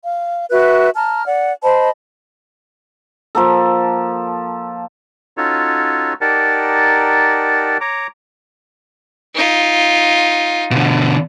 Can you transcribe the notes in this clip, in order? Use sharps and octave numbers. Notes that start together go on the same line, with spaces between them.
F5
F#4 B4 E5 F#6
A5 A#5 F6
D5 F#5
C5 D#5 A5 B5
F3 A#3 A4
C#4 D#4 F4 F#4 A4 C#5
D#4 G4 A#4 D5 F#5 A5
C#5 A#5 D6
D#4 F4
B2 D3